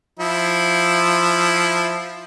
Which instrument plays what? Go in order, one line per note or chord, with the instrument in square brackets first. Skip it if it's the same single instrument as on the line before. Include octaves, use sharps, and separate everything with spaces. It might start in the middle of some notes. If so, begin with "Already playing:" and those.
[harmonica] F3 E4